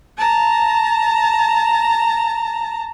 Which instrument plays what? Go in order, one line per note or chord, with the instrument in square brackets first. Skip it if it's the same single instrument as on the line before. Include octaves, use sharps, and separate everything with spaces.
[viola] A5 A#5